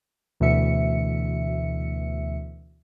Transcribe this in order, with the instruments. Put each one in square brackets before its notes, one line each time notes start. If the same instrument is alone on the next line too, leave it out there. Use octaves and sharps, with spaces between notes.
[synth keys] D2 B2 E3 E5 C#7